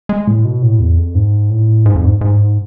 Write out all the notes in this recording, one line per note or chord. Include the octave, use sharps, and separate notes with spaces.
G#3
A2
B2
A2
E2
F2
G#2
A2
G#2
F2
G#2
G#2